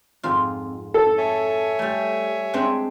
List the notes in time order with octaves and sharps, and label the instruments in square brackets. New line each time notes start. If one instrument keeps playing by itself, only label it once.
[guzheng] F2 G#2 F4
[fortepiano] A4
[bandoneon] C#5 E5 G#5
[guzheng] G3 A3
G#3 C4 D4